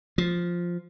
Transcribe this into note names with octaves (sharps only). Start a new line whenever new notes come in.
F3